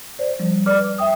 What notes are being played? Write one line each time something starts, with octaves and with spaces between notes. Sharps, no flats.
C5 D5
F3 G3
B4 D5 D6 F6
E5 G5 D#6